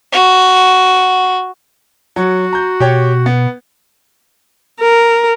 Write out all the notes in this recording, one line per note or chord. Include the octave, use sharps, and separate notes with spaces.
F#4
F#3 F#4
A#5 G6
B2 G4 C#5 G5
B3
A#4